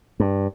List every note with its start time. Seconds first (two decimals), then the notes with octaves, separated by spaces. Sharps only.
0.20 G2